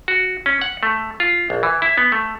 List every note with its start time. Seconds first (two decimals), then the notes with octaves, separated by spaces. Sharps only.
0.08 F#4
0.46 C#4
0.61 F#5
0.83 A3
1.20 F4
1.50 A#1
1.63 E3
1.82 E4
1.98 B3
2.12 A3